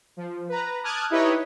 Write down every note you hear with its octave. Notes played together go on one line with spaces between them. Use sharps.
F3
B4 A#5
A5 D6 D#6 F6 F#6 G#6
D#4 E4 G4 B4 C#5 D#5